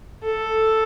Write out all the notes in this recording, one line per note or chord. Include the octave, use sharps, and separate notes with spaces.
A4